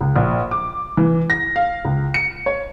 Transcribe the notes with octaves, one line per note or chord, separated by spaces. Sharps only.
C#2
A#1
D6
E3
A#6
F5
C#2
C#7
C#5